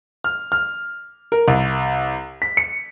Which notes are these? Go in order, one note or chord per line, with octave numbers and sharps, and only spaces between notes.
F6
F6
A#4
C2
B6
C#7